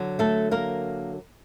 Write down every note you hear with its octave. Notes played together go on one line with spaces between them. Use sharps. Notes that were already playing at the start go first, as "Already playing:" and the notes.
Already playing: D3 F#3
A3 A4
A#3 A#4